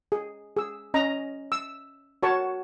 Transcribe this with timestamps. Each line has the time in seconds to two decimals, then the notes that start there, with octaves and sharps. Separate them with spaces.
0.12 G#4
0.57 G#4 E6
0.94 C#4 D#5 A#5
1.52 E6
2.23 F#4 A#4 C#5 A5 C#6